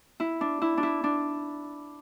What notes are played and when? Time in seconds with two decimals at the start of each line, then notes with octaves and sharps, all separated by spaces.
0.20 E4
0.41 D4
0.62 E4
0.77 D4
0.83 E4
1.04 D4